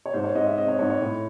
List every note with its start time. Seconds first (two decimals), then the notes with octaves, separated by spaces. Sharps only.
0.06 C#5
0.14 G#2 C5
0.24 C#5
0.35 G#2 D#5
0.46 E5
0.57 C4 D#5
0.68 C#5
0.79 G#2 C#5
0.90 C#5
1.01 A2